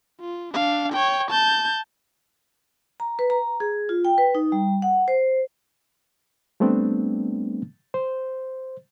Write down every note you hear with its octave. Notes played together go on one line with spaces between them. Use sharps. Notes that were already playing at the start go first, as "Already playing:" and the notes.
F4
D4 F5
C#5 G5
A5 G6
A#5
B4
A#5
G#4
F4
G5
B4
D#4
G3
F#5
C5
G3 A3 B3 C4 D4
C5